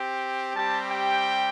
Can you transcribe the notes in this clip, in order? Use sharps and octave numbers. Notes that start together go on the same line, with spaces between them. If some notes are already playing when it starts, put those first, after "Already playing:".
Already playing: C4 G4
G3 C4 G4 A5
G5